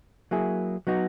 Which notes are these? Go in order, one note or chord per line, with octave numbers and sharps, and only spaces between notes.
F#3 A#3 E4 G#4
F#3 B3 D#4 F#4